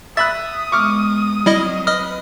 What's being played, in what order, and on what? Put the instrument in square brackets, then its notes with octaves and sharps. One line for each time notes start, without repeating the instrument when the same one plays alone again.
[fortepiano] E5 B5 F#6 [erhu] D#6 [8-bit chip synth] A6
[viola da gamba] G#3 B3 [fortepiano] C#6 D6 F6
[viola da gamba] F#3 C4 [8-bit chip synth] G3 E4 D#5
[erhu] B4 [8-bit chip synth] D#5 D#6 F6